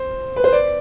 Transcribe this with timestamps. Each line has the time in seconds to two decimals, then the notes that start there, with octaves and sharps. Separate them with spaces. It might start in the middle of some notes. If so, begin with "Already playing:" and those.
Already playing: C5
0.36 B4
0.44 C5
0.53 D5